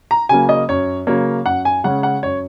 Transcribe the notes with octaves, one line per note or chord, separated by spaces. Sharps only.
A#5
C#3 F#3 A#3 G#5
D#5
F#2 C#5
C#3 F#3 A#3 C#5
F#2 F#5
G#5
C#3 G#3 C#4 F#5
F#5
F#2 C#5